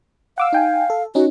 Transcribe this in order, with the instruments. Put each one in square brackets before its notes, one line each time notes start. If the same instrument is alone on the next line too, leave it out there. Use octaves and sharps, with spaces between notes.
[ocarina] F5 [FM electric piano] F#5 D6 E6
[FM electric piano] D#4 G5 G#5
A4
[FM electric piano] C#4 D#4 [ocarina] F#4